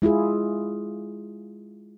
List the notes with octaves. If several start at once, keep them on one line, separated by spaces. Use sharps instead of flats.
G#3 E4 F4 G#4